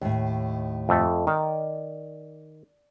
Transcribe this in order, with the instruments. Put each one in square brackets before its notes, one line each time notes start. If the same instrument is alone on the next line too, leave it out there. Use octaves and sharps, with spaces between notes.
[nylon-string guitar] D#2 A2
[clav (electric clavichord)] F2 A3
[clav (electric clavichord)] D#3 [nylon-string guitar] D5